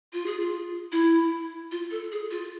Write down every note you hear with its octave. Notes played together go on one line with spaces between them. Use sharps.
F4
G#4
F4
E4
F4
A4
G#4
F4